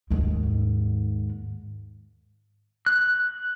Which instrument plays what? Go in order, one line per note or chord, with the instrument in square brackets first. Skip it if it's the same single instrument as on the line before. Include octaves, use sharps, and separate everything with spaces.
[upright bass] D#2 G#2
[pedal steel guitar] F#6